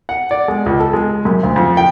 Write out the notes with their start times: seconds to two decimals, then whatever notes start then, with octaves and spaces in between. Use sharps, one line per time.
0.09 F#5
0.31 D5
0.48 G#3
0.66 C#2
0.80 A4
0.93 G#3
1.25 F#2
1.43 D2
1.56 F2
1.77 G5